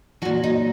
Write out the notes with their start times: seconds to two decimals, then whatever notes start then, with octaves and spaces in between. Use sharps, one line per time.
0.22 F#3 F#4
0.25 A#2
0.44 D#4